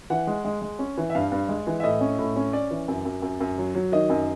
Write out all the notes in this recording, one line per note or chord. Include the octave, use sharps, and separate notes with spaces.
E3 F#5
G#3
G#3
G#3
C#4
E3
E5
G2 F5
G2
G#3
E3
E5
A2 D#5
C#4
A2
C#4
C#4 D5
E3
F#2
F#2
F#2
F#2
F#3
F#3
D#3 D#5
F#2